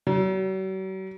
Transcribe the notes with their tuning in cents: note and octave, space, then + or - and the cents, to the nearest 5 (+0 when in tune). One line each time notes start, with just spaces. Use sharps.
F#3 +45